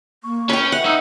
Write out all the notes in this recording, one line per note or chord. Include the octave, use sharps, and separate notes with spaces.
A#3 C#6
C#4 B4 C#5 G5
E5 F#5
D#4 E6